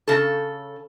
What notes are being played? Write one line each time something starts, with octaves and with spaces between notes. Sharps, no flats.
C#3 A4